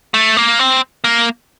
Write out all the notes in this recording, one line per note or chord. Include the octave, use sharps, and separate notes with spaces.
A3
A#3
C4
A#3